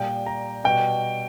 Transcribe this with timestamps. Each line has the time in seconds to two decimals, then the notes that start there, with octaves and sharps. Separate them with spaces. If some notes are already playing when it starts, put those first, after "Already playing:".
Already playing: A#2 G3 G5
0.26 A#5
0.64 B2 G3 G5